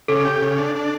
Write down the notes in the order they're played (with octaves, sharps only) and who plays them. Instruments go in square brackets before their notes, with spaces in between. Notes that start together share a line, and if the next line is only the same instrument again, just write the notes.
[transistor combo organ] C#3 [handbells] A4
[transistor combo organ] G4
C#3
D4
D4